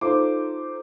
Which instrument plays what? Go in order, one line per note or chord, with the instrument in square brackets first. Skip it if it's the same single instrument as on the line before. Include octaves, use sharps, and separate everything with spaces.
[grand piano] D#4 F4 A4 C5 D6